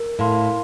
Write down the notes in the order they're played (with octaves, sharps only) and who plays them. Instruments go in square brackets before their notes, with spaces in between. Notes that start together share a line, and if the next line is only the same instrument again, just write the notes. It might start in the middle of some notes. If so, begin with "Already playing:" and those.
Already playing: [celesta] A#4
[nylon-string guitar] A2 [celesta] F5 C6